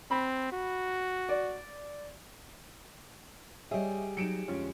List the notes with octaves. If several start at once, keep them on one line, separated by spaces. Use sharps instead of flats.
C4 B5
F#4
D5
G3 G#4 C#5 D#5 E5
F#3 D#4 C#7 D7 E7
F2 D3 G#3 C#4 F4